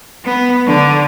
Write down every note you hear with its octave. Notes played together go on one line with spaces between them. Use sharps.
B3
D3